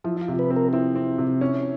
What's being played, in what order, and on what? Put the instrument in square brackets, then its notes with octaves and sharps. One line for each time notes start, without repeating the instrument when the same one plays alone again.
[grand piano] F3 [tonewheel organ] E4
[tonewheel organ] F4
[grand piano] C3
[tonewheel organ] B4
[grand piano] C4
[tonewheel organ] A#4
[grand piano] C4 [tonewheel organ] E4
[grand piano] C4
C3
[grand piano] C#4 [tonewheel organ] E4